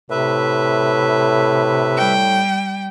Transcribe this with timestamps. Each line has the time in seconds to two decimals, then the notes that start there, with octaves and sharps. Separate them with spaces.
0.10 A2 C3 B4 E5
1.97 G3 G5